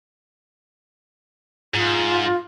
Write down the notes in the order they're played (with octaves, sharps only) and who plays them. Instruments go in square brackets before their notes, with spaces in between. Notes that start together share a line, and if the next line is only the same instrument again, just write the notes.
[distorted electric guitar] G#2 [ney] F4